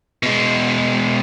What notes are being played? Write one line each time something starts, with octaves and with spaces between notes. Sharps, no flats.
B2 G#3